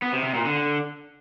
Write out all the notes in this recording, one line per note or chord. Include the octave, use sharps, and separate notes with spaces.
B3
C3
C3
A#2
D3